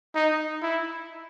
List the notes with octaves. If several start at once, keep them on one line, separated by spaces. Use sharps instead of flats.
D#4
E4